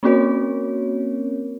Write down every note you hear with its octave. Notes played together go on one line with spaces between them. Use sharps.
A#3 C4 C#4 F#4 A#4 C#5